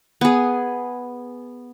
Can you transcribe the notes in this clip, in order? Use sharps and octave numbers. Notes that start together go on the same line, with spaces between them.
B3 G#4